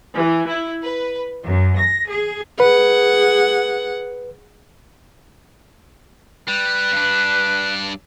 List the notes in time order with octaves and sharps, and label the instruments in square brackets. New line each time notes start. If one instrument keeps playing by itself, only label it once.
[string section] E3
E4
B4
F#2
A#6
G#4
[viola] G#4 F#5 [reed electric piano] B4
[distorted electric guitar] G3 [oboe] B4
[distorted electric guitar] G2 D4